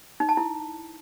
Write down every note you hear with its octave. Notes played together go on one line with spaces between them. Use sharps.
D#4
A5
E4